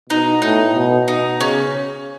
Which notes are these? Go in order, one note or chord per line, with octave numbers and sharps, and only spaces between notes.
B2 D#4
A2 D#4
B2
B2 D#4
C#3 C#4